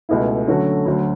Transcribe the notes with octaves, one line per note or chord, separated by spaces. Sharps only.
C#2 B2 A3 E4
D3 F#3 A3 C#4 F#4
D2 D3 F#3